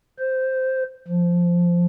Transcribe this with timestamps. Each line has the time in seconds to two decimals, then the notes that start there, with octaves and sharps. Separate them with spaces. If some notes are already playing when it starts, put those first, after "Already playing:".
0.19 C5
1.07 F3